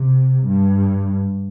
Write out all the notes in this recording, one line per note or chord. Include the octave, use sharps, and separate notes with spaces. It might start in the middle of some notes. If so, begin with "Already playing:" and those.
Already playing: C3
G2